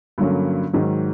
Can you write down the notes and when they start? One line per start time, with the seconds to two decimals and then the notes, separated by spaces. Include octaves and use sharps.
0.18 G2 D3 F#3 A#3 C#4
0.73 G#2 D#3 F#3